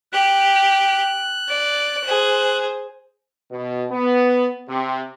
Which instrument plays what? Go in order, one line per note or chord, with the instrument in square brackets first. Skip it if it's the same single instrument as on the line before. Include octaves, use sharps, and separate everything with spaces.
[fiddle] G4 [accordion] F#6
[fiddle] D5
G#4 C5
[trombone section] B2
B3
C3